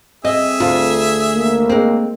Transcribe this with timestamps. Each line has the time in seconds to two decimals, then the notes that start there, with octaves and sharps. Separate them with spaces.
0.25 C4 G#4 D#5 E5
0.60 D2 F4
1.35 A#3
1.70 G#3 C4